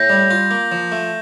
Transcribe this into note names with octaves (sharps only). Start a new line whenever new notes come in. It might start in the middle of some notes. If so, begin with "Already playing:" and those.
Already playing: A2 G6 A#6
G3
F4
A#3
F3
A3